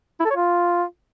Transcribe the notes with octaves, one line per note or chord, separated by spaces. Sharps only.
E4
A4
C#5
F4